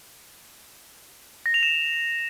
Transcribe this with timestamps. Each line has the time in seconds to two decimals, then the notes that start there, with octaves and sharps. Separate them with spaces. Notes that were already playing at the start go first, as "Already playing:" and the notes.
1.46 A#6
1.54 F7
1.63 E7